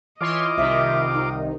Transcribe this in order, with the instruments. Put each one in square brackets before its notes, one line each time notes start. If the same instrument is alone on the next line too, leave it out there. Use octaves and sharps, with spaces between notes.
[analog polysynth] E3 C#5 C6 [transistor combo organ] F4 D6 [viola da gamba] D#5
[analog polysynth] C2 C3 D#3 [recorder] E5
[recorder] D#4